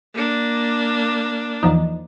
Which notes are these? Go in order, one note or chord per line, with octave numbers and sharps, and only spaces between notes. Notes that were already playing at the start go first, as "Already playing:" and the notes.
A#3 D4
E2 F3 D#4